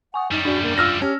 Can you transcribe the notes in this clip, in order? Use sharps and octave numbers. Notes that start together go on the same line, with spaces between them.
F#5 G#5 C#6 D#6
F#2 G3 D#4
D4 F#4 D5
A#3
F4 E6 F6 A#6
C#4 G4 A5